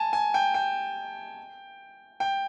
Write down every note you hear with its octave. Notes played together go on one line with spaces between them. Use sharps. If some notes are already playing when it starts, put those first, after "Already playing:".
Already playing: G#5 A5
G#5
G5
G5
G5